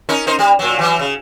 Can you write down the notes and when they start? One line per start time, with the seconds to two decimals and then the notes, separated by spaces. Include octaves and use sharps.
0.09 C#4 D#4 A#4
0.27 D#4 A#4 C5
0.39 G3
0.59 A#2 F#3
0.79 E3 F#3
0.99 C#3